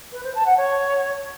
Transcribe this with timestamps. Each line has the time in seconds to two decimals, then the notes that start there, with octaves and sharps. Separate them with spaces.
0.12 B4
0.23 C5
0.35 A5
0.46 F#5
0.57 C#5